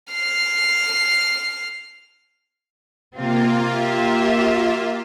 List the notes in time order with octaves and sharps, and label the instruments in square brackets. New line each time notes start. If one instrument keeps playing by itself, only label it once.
[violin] F6 C7
[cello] C3 C4 [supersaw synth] A#3 F4
[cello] G4 E5